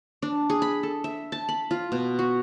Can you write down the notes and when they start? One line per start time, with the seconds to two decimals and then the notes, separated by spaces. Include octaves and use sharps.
0.22 D4
0.50 G#4
0.62 B5
0.83 A4
1.04 E5
1.32 A5
1.49 B5
1.71 F4
1.92 B2
2.19 F#4